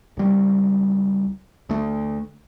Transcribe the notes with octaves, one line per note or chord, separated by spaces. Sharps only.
C#2 G3
D2 A3